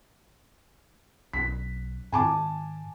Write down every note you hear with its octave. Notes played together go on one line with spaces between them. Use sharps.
B1 C#4 B6
G#2 D#3 G#5 A5 D6